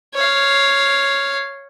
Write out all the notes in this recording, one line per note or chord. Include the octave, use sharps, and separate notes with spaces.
C#5 F5